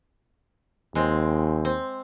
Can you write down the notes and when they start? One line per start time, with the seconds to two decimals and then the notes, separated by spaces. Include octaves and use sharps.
0.95 D#2 G#3 C4
1.65 C4